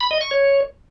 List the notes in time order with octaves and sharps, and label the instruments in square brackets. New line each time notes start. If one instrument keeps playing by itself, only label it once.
[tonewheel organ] B5
D#5
C#6
C#5